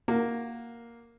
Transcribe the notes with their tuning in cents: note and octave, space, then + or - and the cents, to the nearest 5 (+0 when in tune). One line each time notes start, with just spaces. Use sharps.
A#3 +0 F#4 +0